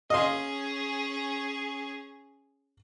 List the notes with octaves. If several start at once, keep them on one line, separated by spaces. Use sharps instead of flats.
C#4 G#4 D#5 F5 C6